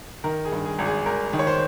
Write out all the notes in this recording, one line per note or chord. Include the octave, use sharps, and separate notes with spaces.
D#3 A#4
G#4
G2
G#4
G#1
G#4
G#1 A#4
D#3
C#5
C5